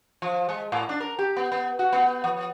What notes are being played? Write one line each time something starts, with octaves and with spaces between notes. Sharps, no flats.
F3
G#3
A2
D4
A#4
G4
B3
B3
F#4
B3
F3